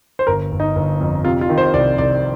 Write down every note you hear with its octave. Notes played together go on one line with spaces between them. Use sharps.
C5
G1 A#4
G1
D#4
G1
F2
C3 F4
F4
D#3
C5
C2 D5
C2 D5